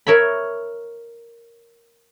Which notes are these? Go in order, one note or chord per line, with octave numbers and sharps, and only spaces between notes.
A#4 C#5 E5 B5